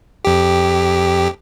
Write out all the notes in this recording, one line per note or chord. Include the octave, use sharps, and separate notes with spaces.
F2 G4